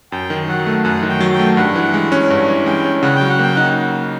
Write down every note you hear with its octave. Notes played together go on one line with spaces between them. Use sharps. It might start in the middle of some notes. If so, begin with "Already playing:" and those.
F#2 G5
D#3
F#3 F#5
A3
F#2 F#5
D#3
G5
F#3
G5
A3
G2 F#5
E3
G#3
C#4
G2
E3
G#3 G5
C#4
C#3 F#5
F#3 G5
F#5
A#3 G5
D#4 F#5